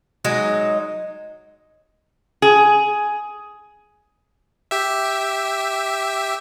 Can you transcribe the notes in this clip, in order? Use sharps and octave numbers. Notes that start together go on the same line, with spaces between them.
F#3 G#3 D#4
G#4
G4 E5